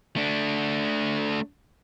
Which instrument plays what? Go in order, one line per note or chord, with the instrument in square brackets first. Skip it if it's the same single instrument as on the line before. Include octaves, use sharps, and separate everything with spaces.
[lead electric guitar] A3 D4